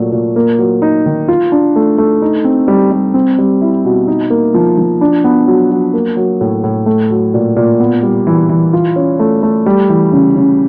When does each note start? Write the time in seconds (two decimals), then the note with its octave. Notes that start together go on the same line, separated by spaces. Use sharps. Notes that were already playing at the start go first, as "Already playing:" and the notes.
Already playing: A#2 F#3 A3
0.12 A#2
0.36 A#3
0.59 F#3
0.82 D#4
1.06 D#3
1.28 F4
1.52 D4
1.76 A3
1.98 A3
2.22 D#4
2.44 C4
2.68 G3
2.91 G3
3.14 C4
3.38 G3
3.61 E4
3.85 B2
4.08 D#4
4.30 A#3
4.54 F3
4.78 F3
5.01 D4
5.24 B3
5.47 F#3
5.71 F#3
5.94 A#3
6.17 F#3
6.41 A2
6.64 A2
6.86 A3
7.10 F#3
7.34 A#2
7.56 A#2
7.80 B3
8.03 G3
8.27 E3
8.49 E3
8.73 F4
8.96 C#4
9.20 A3
9.43 A3
9.66 G3
9.89 E3
10.12 C#3
10.36 C#3